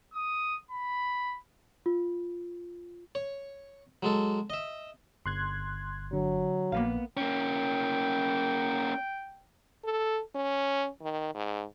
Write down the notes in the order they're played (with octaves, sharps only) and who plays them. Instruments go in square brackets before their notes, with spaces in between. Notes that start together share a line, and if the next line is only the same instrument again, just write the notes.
[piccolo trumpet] D#6
B5
[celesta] F4
[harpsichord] C#5
F#3 G#3 A4
D#5 E5
[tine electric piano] G1 [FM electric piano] C6 F#6 G#6
[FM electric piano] D3 [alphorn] F#3
[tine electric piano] A#1 [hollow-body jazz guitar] A#3 B3 F5
[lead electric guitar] A#3 C#4 [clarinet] G5
[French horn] A4
C#4
D#3
G#2